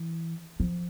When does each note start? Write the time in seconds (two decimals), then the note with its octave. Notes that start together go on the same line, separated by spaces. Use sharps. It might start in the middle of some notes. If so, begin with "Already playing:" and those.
Already playing: E3
0.60 F3